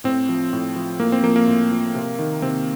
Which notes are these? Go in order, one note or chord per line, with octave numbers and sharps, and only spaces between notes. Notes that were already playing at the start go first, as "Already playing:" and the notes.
A2 C4
F3
A2
F3
A2 A#3
C4
F3 A#3
A#3
A2
F3
C3
D#3
C3 C4